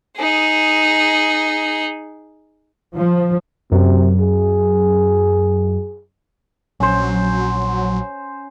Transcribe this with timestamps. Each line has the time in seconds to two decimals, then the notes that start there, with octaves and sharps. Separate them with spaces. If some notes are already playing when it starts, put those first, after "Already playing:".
0.17 D#4 G#4
2.97 F3
3.72 F#2 C3
4.21 G#4
6.80 A#1 F#3 C#4 C5